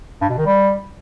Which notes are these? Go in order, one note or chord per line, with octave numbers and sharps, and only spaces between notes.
G2
B2
D#3
G3